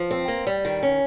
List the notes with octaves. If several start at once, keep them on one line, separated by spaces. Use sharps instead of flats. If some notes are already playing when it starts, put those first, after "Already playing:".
Already playing: F3
C4
A#3
G3
D#3
C#4